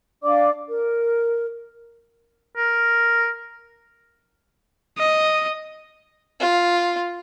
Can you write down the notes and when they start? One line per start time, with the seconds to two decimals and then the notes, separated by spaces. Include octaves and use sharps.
0.23 D4 D5 F5 D6
0.67 A#4
2.57 A#4
4.98 D#5
6.40 F4